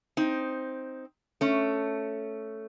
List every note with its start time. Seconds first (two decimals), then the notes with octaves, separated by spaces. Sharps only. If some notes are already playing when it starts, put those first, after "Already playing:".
0.17 C4 D#4
1.41 A3 C#4